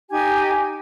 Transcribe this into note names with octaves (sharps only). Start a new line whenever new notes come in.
D#4 G4 G#5 G#6